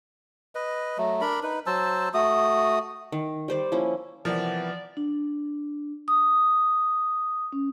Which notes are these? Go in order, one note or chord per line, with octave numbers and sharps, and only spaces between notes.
B4 D#5
F#3 A3
D4 A#4 B5
D#4 B4
F#3 C5 A5 E6
A3 F#4 D#6
D#3
G3 C5 D5
F3 A#3 C#4 E4
C3 E3 F3 G3 B3 A#4 D5
D4
D#6
C#4